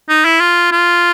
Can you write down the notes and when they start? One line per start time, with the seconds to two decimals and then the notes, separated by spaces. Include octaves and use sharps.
0.09 D#4
0.25 E4
0.40 F4
0.71 F4